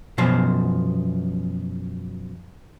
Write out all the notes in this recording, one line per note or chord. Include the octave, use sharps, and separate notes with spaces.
F#2 B2 F3 C5